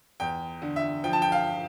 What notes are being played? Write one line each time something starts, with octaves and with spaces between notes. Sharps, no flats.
E2 G5
D3
E5
F3 G5
A5
G5
F5